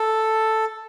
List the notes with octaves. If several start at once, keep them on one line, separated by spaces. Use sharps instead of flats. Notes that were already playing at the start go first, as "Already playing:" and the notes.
Already playing: A4